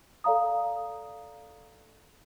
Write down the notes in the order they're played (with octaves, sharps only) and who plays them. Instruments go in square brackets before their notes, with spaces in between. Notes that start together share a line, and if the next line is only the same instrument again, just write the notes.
[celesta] A4 D5 F5 A#5 D#6